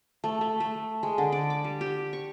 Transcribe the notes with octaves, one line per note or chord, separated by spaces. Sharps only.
A3
A3
A3
G#3
D3
D5
D6
G3
G4
C#6